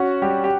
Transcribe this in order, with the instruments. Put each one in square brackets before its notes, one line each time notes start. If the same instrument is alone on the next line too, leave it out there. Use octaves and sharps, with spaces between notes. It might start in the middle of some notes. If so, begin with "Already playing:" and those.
Already playing: [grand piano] C#4 [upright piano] F#4
[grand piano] G3 [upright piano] G4
[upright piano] G4